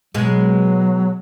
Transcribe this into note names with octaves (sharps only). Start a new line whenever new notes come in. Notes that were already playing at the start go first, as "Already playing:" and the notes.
B2 F#3 G#3